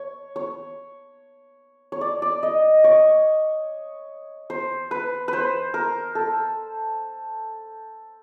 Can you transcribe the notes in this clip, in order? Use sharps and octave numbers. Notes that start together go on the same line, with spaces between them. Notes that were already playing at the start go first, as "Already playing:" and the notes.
Already playing: C#5
C#5
C#5
D5
D5
D#5
C#5
C5
B4
B4 C5
A#4
A4